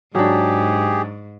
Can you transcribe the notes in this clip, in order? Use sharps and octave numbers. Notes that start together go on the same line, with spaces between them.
G#2 F#3 D4 G4 G#4